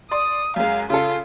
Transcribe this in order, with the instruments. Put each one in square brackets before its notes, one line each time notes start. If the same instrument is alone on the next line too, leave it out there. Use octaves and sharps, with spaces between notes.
[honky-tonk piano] D5 C6 [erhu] D#6
[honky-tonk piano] F#2 G#3 [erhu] F5
[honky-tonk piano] C#3 A4 [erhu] F4